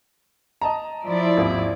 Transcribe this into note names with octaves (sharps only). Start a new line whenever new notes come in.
D#5 A5 A#5
F3 E4 D5
G#1 D#2 F4